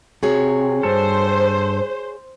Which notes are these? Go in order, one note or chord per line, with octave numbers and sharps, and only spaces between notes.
C3 F#4 G#4 C#5
G2 A4 C5